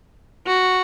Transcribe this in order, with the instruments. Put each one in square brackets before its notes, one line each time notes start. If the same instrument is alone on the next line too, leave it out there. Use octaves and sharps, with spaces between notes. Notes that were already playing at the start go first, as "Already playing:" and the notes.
[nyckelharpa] F#4